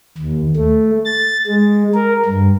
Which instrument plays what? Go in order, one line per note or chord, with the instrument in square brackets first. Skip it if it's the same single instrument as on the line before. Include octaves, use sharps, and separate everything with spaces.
[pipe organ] D#2
A3
A6
G#3
A#4
G2